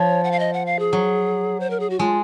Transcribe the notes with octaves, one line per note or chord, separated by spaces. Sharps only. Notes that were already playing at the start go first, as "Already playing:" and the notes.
Already playing: F3 C#5
F#5
F5
D#5
F#5
F5
G#4
F#3
C5
A#4
G#4
F#4
G#3 F4